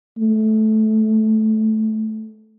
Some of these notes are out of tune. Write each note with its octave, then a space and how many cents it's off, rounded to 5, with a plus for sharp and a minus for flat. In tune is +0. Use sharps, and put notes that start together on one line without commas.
A3 -15